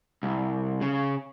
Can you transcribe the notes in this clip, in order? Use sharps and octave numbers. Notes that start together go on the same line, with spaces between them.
C2
C#3